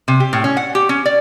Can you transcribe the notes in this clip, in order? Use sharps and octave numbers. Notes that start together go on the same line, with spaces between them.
C3
G4
A2
C#4
F#5
G4
C#4
D5